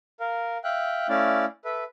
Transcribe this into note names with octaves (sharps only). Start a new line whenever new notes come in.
A#4 F5
E5 F5 G5 F#6
A3 C#4 E4 D5 F5
A4 B4 E5